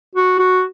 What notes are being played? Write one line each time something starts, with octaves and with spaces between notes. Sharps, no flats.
F#4
F#4